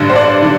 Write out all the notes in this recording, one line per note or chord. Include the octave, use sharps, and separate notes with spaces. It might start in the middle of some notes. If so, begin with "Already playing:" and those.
Already playing: A1 G2 D3
C5
D5
D3